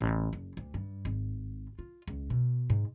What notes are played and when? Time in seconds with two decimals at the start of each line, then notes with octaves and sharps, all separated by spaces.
0.01 A1
0.33 F#1
0.57 D2
0.74 G2
1.05 G#1
1.79 F4
2.08 C#2
2.30 B2
2.70 G#2